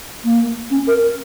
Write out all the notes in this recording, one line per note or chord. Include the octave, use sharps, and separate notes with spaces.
A#3
C#4
A#4